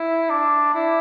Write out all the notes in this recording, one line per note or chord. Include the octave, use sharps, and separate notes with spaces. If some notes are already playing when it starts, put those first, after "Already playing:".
Already playing: E4
D4
E4